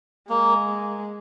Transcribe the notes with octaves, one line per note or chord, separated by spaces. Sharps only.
G#3 A#3